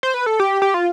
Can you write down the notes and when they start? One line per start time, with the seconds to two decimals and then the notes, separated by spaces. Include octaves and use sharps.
0.03 C5
0.14 B4
0.26 A4
0.40 G4
0.62 G4
0.74 F4